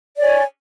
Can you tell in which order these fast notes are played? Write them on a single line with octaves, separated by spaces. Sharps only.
D5 C#5 G#5